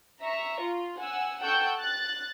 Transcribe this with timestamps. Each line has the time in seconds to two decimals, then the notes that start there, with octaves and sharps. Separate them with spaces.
0.21 E5 A#5 C#6
0.60 F4
1.00 F#5 G#5 E6
1.42 A4 F#5 G5 C#6 E6 G6
1.78 F#6 A6